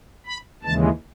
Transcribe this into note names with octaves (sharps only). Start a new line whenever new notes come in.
B5
D#2 C#3 E3 G#3 A5